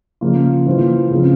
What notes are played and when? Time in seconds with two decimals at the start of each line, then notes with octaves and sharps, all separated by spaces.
0.21 C#3 F3 A#3 F4
0.66 E3 A#3 F4 C5
1.11 C#3 F3 C4